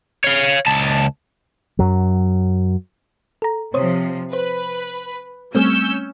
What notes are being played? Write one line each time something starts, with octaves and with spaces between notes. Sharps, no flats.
C#5 F5
C#2 A5
F#2 F#3
A4 A#5
C3 F3 C5 C#5 D#6
B4 C5
G3 A3 C4 C#4 E6 G6